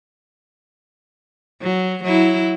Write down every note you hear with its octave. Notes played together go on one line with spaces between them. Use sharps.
F#3
F#3 E4